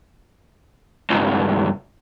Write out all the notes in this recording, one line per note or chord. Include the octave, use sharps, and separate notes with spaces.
C#2 G2